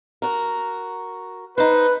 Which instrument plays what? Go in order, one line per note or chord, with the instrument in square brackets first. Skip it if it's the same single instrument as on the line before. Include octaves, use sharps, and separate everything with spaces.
[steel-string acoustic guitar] F#4 A#4
[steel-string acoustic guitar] D#4 C5 [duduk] B4